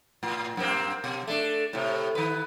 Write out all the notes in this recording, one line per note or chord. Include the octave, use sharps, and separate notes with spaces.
A2
F#2 A#3 C4
B2
A3 D4
A2 C3
D#3 B4